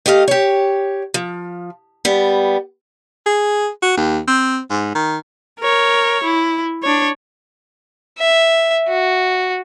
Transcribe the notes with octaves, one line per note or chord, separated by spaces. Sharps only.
A3 G4 D#5 F5
G4 C#5
F3
G3 B3
G#4
F#4
D#2
C4
G#2
D#3
A#4 C#5
E4
D4 C#5
E5
F#4